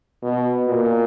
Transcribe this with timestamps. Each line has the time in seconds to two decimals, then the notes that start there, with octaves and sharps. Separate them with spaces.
0.23 B2
0.68 A#2